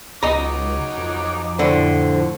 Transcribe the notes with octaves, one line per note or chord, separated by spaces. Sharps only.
C#2 F#3 D#4 D#5 A#5 D6
F2
A2 D3 C5